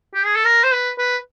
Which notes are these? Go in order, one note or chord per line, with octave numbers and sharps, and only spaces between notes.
G4
G#4
A4
A#4
C5
B4
B4